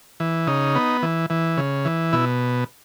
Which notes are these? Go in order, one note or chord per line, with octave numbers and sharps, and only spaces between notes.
E3
C#3 D#4
B3
E3
E3
C#3
E3
B2 E4